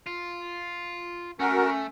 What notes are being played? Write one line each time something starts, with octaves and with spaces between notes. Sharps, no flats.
F4
A3 C#4 F#4 A#4